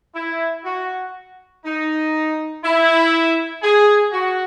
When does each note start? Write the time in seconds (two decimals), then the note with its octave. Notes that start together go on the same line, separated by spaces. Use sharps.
0.15 E4
0.65 F#4
1.65 D#4
2.64 E4
3.63 G#4
4.12 F#4